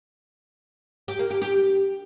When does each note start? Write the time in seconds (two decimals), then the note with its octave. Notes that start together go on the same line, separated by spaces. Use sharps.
1.08 G4
1.19 A#3
1.30 G4
1.42 G4